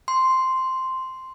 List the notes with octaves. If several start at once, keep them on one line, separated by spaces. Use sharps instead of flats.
C6